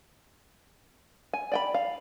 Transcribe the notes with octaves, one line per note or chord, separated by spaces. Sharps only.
G#5
D5 G5 B5
F5